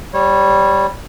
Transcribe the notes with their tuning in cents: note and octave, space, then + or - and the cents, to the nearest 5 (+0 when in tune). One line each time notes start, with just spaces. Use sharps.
G3 +0 C#5 -25